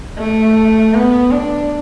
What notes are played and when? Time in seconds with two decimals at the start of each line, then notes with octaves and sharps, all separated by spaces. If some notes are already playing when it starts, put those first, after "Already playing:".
0.19 A3
0.94 B3
1.31 D4